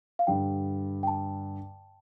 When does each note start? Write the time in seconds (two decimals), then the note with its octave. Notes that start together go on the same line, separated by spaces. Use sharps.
0.19 F5
0.27 G2 D3 G3 G5
1.03 G5
1.07 A5